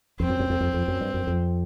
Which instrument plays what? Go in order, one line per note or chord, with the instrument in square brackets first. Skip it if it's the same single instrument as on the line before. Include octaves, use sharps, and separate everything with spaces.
[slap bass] F2 [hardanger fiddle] C4
[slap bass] F#2
F#2
F2
F2
F2
F#2
G2
F#2
F2